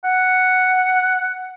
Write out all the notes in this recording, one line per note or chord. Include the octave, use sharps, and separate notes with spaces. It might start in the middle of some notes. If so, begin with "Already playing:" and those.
F#5